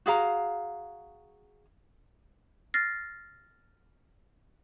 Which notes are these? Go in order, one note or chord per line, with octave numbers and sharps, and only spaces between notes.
F#4 G#4 F5 A#5
F6 A6 A#6 C7